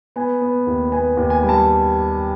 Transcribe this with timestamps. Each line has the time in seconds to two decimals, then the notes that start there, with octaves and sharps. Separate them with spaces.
0.16 B3 G#5
0.41 B3
0.67 D#2
0.92 B3 G#5
1.17 D#2
1.30 G#5
1.43 G3
1.49 A5